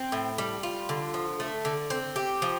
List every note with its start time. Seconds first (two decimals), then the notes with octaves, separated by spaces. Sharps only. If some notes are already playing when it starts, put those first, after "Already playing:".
Already playing: C4
0.12 A2
0.38 G3
0.63 F4
0.89 D3
1.14 F3
1.40 A3
1.65 D3
1.90 C4
2.16 G4
2.42 F3